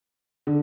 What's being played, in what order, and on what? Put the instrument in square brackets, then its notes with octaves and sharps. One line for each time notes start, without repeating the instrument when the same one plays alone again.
[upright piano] D3